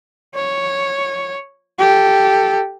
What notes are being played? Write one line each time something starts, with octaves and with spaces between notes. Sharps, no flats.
C#5
G4 A4